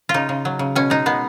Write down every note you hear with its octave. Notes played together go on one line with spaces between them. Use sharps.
F4
C#3 D#4
C#3
F#3
C#3
B2 C#4
G#3 D#4
G#3 B3